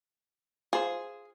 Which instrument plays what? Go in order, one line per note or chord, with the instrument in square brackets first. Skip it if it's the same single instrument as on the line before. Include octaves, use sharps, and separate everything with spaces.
[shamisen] F4 C5 [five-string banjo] G#4